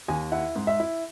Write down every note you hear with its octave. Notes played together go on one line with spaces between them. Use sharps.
D#2 G#5
E4 F#5
G#2
E5
E4